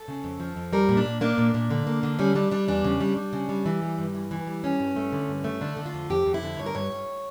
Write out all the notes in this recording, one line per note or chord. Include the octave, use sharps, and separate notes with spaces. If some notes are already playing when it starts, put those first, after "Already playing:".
Already playing: A4
C#3
F2
F3
F2
G3 A#4
A#2
D4
A#2
A#3 D4
A#2
A#2
D3
A#3
D3
G3 C#4
G3 D4
G3 D4
E2 D4
C#3
G3
G3
C#3
G3
E3
G3
G2
E3
E3
G3
G2 C#4
G2
A3
D3
G2
A3
D3 D4
D3
F4
F2
F2 G4
F2
E4
D3
G2 C#5
A#4
G2 C#5
G2